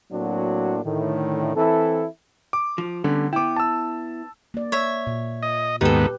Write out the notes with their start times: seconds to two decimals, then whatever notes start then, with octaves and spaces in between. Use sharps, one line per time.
0.11 A2 F#3 A#3 C4 D4 F#4
0.84 A2 D3 D#3
1.56 E3 C4 E4 A4
2.53 D6
2.78 F3
3.04 D3 G3 B3 C#4
3.33 B3 E4 G5 D6
3.56 A5 E6
4.54 A#3 D5
4.72 C#5 E5
5.07 A#2
5.43 D#5
5.81 D#2 G#2 B3 D#4 G4 A4 B4